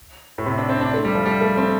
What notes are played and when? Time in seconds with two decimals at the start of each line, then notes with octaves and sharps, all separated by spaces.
0.38 A2
0.46 C3
0.58 D4
0.69 C4
0.81 D4
0.94 A3
1.05 G3
1.15 F3
1.26 G3
1.41 A3
1.57 C4